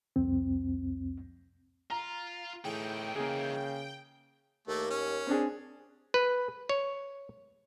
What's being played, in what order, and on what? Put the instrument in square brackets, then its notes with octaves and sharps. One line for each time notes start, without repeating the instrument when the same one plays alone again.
[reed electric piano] C2 F2 C4
[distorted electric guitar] F4 [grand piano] A#5
[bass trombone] A2 [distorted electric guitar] E3 D#4 [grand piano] G#4 [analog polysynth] G5
[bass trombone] C#3 [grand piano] A#3 G#4
[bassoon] D#2 [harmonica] A3 A#3
[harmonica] C#4
[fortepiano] C4 D4 G#4
[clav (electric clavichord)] B4
C#5